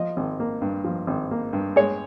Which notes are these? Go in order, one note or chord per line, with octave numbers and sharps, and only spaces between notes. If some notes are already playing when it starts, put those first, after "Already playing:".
Already playing: F3 D#5
G#1
A#3
G2
F3
G#1
A#3
G2
G#3 C#5